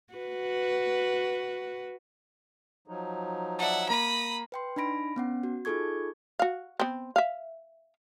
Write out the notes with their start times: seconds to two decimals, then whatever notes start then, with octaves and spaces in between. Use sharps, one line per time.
0.14 F#4 B4
2.88 F3 F#3 D#4
3.59 D5 E5 F#5 A5
3.89 A#3 A#5 B5 D#6
4.52 B4 G5 C6
4.76 D4 D#4 B5 A#6 D7
5.16 B3 C#4 F#5
5.43 F#4
5.65 D#4 F4 G#4 A4 C#6 G#6
6.39 F#4 F5
6.80 B3 C4
7.16 E5 F5